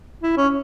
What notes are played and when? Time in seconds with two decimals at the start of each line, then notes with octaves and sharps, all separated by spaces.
0.23 E4
0.37 C#4